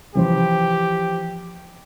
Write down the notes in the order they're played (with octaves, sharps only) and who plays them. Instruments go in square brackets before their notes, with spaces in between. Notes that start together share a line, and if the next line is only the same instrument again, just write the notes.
[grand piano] E3 F3 C5 [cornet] G4